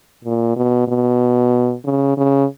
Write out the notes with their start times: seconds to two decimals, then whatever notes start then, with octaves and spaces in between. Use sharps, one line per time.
0.24 A#2
0.56 B2
0.88 B2
1.84 C#3
2.17 C#3